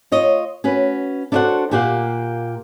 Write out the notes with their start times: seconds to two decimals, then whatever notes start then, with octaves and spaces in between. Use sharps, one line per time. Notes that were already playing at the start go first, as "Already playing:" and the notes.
0.12 F4 C#5 D#5
0.64 C#4 F#4 B4
1.32 D4 E4 F#4 A4 C5 F#5
1.71 A#2 A#3 G4 F5 F#5